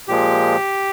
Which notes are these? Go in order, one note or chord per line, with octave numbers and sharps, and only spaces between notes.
A#2 F3 G#3 G4